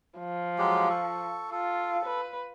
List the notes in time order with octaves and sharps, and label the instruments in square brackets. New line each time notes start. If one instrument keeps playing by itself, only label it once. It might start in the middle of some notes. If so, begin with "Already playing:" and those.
[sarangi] F3
[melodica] F#3 G#3 G4
A4 C#6
[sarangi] F4 [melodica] A4
[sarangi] B4